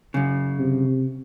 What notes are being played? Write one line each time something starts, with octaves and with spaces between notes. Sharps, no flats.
F#2 C#3
C3